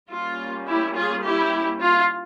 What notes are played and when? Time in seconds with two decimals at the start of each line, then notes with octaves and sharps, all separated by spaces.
0.10 G3 A#3 C#4 F4
0.67 E4 G4
0.95 F4 G#4
1.23 E4 G4
1.81 F4